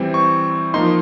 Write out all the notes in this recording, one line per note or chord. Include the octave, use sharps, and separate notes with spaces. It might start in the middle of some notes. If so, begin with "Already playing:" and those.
Already playing: E3 G3 C4
C#6
F3 A#3 D#4 C6